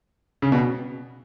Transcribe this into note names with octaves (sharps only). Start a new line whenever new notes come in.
C#3
B2